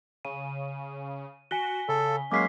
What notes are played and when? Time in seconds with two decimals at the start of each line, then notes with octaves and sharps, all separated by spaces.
0.25 C#3 D#7
1.51 F#4 G#5 B6 G7
1.88 C#3 A4
2.32 F#3 G#3 A#3 C#4 D6 B6 C7